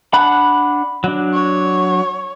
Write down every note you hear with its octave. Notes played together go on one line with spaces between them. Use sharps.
D4 F#5 B5
F#3 D4
C#5